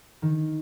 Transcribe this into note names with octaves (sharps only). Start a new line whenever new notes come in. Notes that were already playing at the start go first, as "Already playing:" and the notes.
D#3